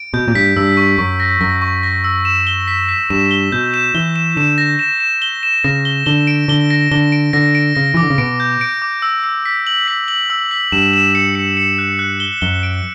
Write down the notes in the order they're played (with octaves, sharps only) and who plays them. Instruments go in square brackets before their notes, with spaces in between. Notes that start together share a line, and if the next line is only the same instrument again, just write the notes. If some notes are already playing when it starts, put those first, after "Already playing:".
Already playing: [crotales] D7
[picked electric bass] B2 [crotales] G6
[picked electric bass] A#2
[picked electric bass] G2 [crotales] B6
[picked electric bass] G2 [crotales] E6
[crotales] C#6
[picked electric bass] F#2 [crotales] C#6
[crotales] A#6
[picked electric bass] F#2 [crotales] A#6
[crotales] C#6
A#6
E6
E7
G7
B6
B6
[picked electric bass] G2 [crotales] E7
[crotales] G7
[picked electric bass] B2 [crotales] G6
[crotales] E7
[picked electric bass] E3 [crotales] G7
[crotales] E7
[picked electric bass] D3 [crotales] E7
[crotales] A#6
E7
E7
G7
E7
[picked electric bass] C#3 [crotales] A#6
[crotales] G7
[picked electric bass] D3 [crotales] G7
[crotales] D7
[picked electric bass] D3 [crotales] G7
[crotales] A#6
[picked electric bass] D3 [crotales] G7
[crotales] D7
[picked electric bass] D3 [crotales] A#6
[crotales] D7
[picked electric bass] C#3 [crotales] A#6
[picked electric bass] E3 [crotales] D6
[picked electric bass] D3
C#3
[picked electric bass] B2 [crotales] D7
[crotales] G6
D7
D6
E6
E6
B6
F#7
B6
F#7
E6
B6
[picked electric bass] G2 [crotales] E7
[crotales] E7
C#7
C#7
C#7
F#6
F#6
G7
[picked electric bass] F#2 [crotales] G7
[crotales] D7